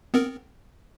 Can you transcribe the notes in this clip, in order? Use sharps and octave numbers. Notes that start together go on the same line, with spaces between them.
B3 C4 A#4